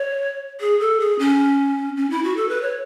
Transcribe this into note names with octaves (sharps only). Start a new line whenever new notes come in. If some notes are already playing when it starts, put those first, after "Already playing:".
Already playing: C#5
G#4
A4
G#4
C#4
C#4
E4
F#4
A4
B4
C#5